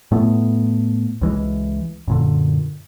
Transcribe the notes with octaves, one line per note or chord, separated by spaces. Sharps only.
A2 A3 B3
C#2 E3 G#3
F#2 A#2 D3